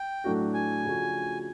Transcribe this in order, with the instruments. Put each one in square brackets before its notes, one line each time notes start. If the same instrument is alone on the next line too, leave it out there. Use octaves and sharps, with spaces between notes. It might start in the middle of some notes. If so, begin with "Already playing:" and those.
Already playing: [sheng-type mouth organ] G5
[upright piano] A2 F#3 A3 D4 F#4
[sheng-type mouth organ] G#5
[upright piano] C#3 F3 A3 D4 F#4